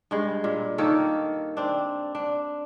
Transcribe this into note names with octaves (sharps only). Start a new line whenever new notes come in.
G2 G#3
A#2
D#3 A#3 A4 C#5
C4 D4
D4